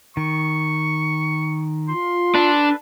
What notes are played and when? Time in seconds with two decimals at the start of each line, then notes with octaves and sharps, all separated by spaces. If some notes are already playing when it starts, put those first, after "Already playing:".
0.17 D#3 C#6
1.89 F4 C6
2.34 D4 A4 B4